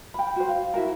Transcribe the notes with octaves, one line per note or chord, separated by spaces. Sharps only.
G5 B5
F#4 C5
F5
E4 F#4 A#4